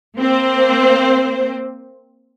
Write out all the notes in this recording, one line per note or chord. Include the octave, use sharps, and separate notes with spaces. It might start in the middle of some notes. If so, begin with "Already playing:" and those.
A#3 C4 C5